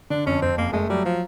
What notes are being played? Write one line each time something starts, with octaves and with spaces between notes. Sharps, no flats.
D3 D4
F2 C#4
F2 C4
F#1 A#3
G#3 A3
F#3 G3
F3